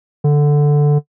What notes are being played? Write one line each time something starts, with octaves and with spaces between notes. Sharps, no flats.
D3